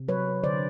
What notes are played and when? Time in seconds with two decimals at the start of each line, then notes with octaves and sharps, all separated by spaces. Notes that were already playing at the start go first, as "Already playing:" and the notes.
Already playing: C3
0.08 F#3 B4 C#5
0.43 D3 C5 D5